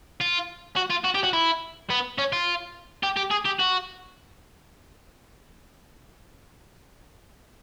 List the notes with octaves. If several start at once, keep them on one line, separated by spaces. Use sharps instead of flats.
F4
F#4
F4
F#4
G4
F#4
E4
B3
C#4
F4
G4
G4
G#4
G4
F#4